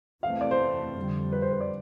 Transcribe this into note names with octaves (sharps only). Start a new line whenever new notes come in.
E2 C3 E3 A3 C4 F5
D5
C5
F2 D3 G3
B4
C5
B4
D5